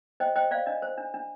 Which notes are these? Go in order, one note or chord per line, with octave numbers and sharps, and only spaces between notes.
C5 D#5 G5
C5 D#5 G5
C5 D5 F5
D4 D#5
C5
D4
D4